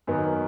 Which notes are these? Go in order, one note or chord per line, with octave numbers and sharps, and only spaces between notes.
F#2 D#3 B3